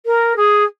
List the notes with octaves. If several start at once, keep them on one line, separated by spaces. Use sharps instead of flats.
A#4
G#4